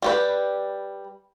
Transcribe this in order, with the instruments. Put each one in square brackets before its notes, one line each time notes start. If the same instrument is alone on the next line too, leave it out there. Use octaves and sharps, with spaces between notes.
[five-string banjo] G3 G4 B4